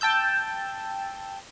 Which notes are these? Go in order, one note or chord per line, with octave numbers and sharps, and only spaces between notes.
G5 A5 E6 G6